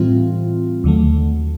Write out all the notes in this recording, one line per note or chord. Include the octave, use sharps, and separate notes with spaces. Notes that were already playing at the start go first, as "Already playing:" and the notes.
Already playing: A2 E3 G3 C4 F4
D#2 D3 F#3 A3